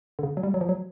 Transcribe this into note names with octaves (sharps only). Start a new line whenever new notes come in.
D3
C#3
F#3
G3
F#3
F3
F#3